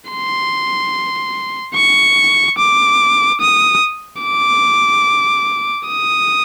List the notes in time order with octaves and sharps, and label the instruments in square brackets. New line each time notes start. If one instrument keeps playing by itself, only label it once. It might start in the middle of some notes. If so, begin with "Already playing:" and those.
[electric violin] C6
C#6
D6
D#6
D6
D#6